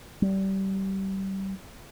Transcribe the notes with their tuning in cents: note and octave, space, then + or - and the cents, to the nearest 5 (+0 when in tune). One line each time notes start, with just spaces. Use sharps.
G3 -25